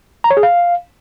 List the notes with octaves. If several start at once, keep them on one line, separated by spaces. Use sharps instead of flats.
A#5
C#5
G#4
F5